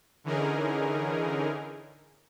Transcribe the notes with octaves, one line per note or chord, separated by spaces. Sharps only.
D3 E3 C#4 D#4 G#4 A#4